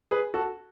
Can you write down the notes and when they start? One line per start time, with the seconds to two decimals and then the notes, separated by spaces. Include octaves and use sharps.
0.11 G#4 B4
0.34 F#4 A4